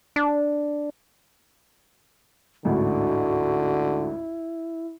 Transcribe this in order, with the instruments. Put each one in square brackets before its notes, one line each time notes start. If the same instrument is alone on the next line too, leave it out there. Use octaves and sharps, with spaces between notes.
[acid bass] D4
[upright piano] A1 D2 G#2 [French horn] D3 [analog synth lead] E4 [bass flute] F#4